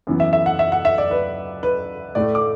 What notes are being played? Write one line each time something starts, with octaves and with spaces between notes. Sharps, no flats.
F#2 E3 B3
E5
E5
F#5
E5
F#5
E5
D5
B4
B4
A2 A3 D5
D6